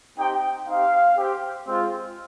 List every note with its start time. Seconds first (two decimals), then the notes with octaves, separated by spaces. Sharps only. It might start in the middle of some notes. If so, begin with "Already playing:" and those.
0.17 C4 D#4 G4 G5
0.66 C4 D#4 G4 F5
1.16 C4 G4
1.66 G#3 C4 F4